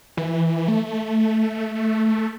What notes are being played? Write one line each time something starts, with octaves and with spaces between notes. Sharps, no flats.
E3
A3